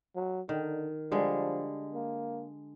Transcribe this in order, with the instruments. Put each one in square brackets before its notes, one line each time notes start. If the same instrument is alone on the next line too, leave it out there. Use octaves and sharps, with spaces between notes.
[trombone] F#3
[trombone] D3 [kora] D#3
[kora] D3 G3 G#3 [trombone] F3
[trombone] A#3